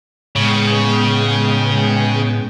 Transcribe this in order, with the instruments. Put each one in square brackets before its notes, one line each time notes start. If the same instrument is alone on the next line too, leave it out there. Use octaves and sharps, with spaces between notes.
[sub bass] A2 [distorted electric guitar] C#3 [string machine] G#3 B3 G5